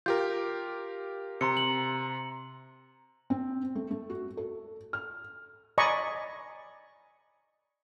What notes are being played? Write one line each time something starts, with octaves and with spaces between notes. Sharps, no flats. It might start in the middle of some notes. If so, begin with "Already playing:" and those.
F4 G4 A#4 G6
C3 A#5 C6 C#7
F#7
C4
A3
A3
F#4
A4
F6
D5 D#5 G#5 A#5 B5 C#6